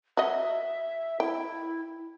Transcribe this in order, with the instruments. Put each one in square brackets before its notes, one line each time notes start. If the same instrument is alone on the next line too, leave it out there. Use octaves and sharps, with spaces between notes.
[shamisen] F#4 D#5 [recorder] E5
[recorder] E4 [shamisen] G5